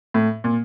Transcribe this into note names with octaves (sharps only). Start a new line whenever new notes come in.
A2
A#2